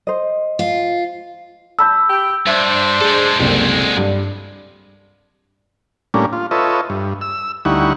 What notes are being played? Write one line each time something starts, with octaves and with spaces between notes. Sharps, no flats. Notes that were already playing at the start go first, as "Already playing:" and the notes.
C5 D#5
F4
A5 B5 E6 G6
G4 G5
G2 D4 C5 E5
G#3 G#4 A4
F#1 C2 A#2 D3 C4
G2
A2 G3 A#3 C#4 D4
F4
F4 A4 B4 C#5 D#5 E5
G2
E6
D2 G3 D#4 E4 F#5 C#6